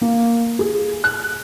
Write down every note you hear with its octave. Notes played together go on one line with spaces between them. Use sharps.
A#3
G#4
F#6